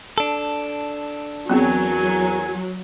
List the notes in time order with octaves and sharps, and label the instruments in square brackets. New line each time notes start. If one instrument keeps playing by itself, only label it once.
[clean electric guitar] D4 A4
[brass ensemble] E2 A#4 G#5 [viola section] F#3 [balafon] B3 C4 G#4